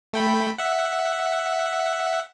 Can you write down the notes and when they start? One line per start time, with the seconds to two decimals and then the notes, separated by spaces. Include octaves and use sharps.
0.13 A3 G5 B5
0.58 E5 F#5